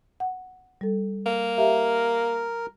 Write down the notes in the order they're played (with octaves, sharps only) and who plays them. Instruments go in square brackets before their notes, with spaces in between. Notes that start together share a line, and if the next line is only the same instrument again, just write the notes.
[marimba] F#5
G3 A4
[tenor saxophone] A#3
[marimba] G4 E5 F5 [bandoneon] A#4